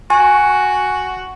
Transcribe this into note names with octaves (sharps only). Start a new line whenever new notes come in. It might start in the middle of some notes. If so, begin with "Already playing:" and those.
F#4 G#5